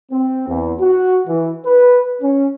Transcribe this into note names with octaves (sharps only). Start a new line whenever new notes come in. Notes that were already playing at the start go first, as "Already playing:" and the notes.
C4
E2
F#4
E3
B4
C#4